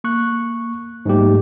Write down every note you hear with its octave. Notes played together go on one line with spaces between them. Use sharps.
A#3 C#6 F#6
G#2 F#3 G3 A3 A#3 G4